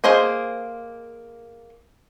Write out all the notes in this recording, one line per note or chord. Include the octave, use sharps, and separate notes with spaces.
A#3 G#4 C5 D#5 G#5